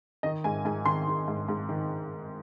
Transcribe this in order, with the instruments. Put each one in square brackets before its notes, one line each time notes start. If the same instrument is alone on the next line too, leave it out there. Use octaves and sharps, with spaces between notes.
[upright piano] D#3 D#5
G#2 G#5
G#2 G#5
D#3 C6
D#3
G#2
G#2
D#3